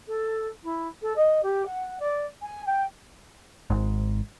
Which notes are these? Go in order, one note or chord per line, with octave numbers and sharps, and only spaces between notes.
A4
E4
A4
D#5
G4
F#5
D5
G#5
G5
G#1 G#2